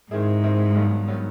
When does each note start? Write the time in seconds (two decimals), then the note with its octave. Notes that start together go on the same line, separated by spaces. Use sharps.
0.11 G#2 D#3 G#3 C4 E4 G#4
0.43 D#3 G#3 C4 E4 G#4
0.75 G2 D#3 F#3 B3
1.08 D#3 F#3 B3